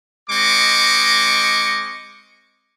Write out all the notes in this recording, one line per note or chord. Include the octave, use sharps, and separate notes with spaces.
G#3 C4 D#5 C#6 D6